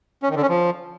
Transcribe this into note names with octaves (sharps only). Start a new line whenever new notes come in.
C#4
D#3
D3
C#4
F3